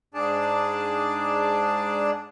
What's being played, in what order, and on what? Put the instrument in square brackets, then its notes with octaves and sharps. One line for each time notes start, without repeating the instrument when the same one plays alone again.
[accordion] G#2 D4 G#4 D5 A5